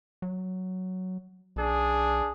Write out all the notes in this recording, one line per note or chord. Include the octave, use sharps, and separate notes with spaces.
F#3
B1 D4 G#4